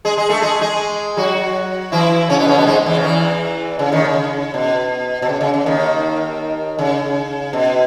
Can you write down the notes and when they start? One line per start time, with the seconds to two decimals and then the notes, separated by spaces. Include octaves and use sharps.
0.05 G#3 G#4
0.18 G#3 G#4
0.29 A3 A4
0.42 G#3 G#4
0.61 G#3 G#4
1.17 F#3 F#4
1.92 E3 E4
2.30 C#3 C#4
2.39 B2 B3
2.48 C#3 C#4
2.58 B2 B3
2.67 G#2 G#3
2.86 E2 E3
2.95 C#3
3.04 E2 E3
3.79 C#3
3.92 D#2 D#3
4.05 C#3
4.54 B2
5.22 B2
5.29 C#3
5.41 C#3
5.54 C#3
5.66 D#2 D#3
6.79 C#3
7.53 B2